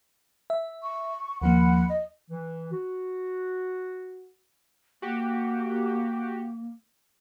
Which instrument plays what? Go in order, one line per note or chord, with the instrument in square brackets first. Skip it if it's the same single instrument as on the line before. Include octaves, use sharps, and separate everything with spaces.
[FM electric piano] E5
[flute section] C#6
[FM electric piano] D#2 F3 A#3 [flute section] F#5 B5
[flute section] D#5
[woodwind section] E3
F#4
[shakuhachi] A#3 [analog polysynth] F#4 G4